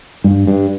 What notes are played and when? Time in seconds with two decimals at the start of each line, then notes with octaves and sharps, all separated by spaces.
0.24 G2
0.47 G2